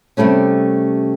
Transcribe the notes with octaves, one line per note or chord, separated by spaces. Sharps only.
C3 F3 G3 A3 C#4